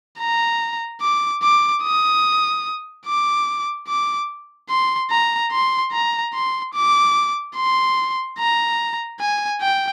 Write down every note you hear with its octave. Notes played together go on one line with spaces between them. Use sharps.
A#5
D6
D6
D#6
D6
D6
C6
A#5
C6
A#5
C6
D6
C6
A#5
G#5
G5